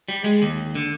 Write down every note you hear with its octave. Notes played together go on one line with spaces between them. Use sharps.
G3
G#3
D#2
D3